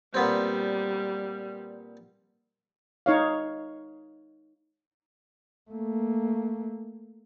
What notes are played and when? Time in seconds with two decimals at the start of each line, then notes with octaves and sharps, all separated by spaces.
0.14 A#2 G3 B3 C4
3.06 D#4 C#5 F5
5.71 A3 A#3